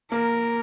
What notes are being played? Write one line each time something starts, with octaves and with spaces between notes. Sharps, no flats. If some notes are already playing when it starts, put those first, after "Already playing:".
A#3 A#4